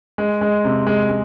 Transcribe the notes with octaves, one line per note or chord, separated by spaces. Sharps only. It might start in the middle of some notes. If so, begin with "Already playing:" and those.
G#3
G#3
C3
G#3
G#3